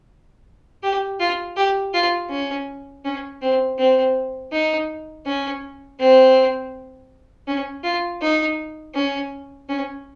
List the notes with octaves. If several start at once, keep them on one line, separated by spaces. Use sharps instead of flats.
G4
F4
G4
F4
C#4
C#4
C4
C4
D#4
C#4
C4
C#4
F4
D#4
C#4
C#4